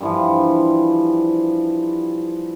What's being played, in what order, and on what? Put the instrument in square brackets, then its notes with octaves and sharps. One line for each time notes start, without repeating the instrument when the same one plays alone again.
[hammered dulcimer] G2 E3 F3